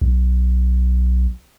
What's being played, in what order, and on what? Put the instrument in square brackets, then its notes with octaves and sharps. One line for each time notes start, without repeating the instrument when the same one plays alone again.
[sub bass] B1